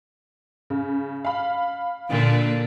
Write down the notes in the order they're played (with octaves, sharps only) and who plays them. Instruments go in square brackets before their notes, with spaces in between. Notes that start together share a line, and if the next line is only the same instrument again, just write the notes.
[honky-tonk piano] C#3
F5 B5
[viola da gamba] A#2 D3 A#3